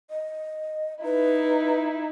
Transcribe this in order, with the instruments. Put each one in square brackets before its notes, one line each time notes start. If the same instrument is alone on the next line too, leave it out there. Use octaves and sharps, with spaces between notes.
[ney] D#5
[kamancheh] D#4 E4 [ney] B4